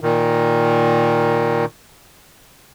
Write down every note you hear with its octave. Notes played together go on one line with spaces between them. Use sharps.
A#2 D#3